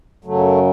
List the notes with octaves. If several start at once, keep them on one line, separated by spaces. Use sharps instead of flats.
F#2 C#3 F#3 A3